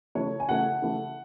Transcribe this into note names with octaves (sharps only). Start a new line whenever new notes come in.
C#3 E3 A3 E4 C#5
G#5
C#3 E3 A3 E4 F#5
C#3 E3 A3